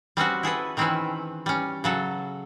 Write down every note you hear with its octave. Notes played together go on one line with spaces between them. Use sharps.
G3 C4 C#4 F#4
E4 G#4 A4 B4
D#3 E3 C4 C#4 E4 B4
G3 C#4
C#3 F#3 A4